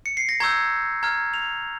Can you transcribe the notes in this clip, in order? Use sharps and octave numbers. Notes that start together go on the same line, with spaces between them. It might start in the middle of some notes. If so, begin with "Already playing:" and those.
C#7
C7
A#6
A#5 C#6 E6 G6 G#6
A#5 F6 G#6
F7